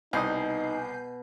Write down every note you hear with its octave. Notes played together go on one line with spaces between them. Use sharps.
C2 B2 D#4 D#5 G#5 G6 C7